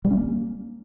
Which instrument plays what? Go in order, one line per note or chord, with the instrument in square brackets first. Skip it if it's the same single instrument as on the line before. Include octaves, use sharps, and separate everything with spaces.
[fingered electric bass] G3
C#4
A#3